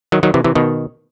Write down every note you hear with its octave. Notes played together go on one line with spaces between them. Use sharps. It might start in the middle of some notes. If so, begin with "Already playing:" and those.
D#3 F#3
D#3 F#3
C3 E3
C3 E3
B2 D#3